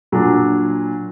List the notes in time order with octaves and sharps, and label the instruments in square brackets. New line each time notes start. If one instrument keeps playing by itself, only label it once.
[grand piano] A#2 F#3 D4